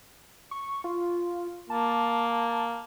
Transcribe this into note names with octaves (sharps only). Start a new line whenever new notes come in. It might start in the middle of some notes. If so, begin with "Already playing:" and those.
C#6
F4
A#3 A5